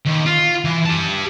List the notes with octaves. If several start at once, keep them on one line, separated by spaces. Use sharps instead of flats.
D#2
F4
E3
G4 A5